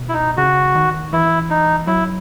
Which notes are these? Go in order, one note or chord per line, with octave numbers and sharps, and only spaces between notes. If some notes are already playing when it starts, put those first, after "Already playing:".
Already playing: B2
E4
D#4
C#3 F#4
D#3
E3 E4
D#4
F#3 E4